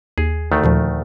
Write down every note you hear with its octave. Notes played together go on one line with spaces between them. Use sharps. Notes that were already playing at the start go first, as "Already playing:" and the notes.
D#2 G#4
D2 D#3 A3
D#2 A#2 F3